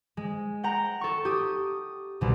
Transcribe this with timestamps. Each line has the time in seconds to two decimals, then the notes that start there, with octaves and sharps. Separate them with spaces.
0.17 G#3
0.64 F#5 G5 A#5
1.01 A4 C#6
1.25 G4 D#6
2.21 C2 B2